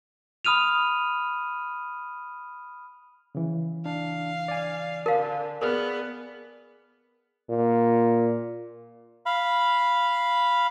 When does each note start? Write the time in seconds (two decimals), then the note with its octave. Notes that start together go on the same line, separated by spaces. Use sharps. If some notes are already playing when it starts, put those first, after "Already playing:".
0.45 B5 D#6 F6 D#7 F7
3.35 C#3 E3
3.86 D4 F5
4.48 D5 G#5
5.06 D3 A#4 F5 A5
5.62 B3 G#4 A#4 D5 F6
7.49 A#2
9.26 F5 B5